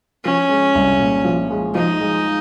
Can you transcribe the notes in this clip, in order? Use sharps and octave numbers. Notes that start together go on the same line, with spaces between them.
F3 C#4
G#3
C2
A#2
F3
G#3
F3 D#4
G#3